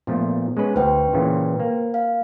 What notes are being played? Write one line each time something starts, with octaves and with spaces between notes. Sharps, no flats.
A#2 F3 A3 B3
G#3 C#4 B4
D2 B4 C5 G5
A#2 C#3 E3
A#3
F5